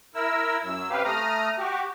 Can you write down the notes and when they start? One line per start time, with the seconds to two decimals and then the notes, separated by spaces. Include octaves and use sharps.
0.15 E4 A#4 E6
0.64 F#2 F#3 E6
0.90 C3 G4 B4 F5
1.05 A3 A#5 D#6 F6
1.59 F#4 G4